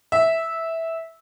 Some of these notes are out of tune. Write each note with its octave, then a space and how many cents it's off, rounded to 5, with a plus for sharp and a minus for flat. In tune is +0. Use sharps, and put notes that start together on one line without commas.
E5 -10